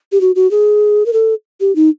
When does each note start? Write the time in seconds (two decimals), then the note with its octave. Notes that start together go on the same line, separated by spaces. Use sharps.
0.12 G4
0.21 F#4
0.36 F#4
0.51 G#4
1.06 A#4
1.13 A4
1.60 G4
1.76 D#4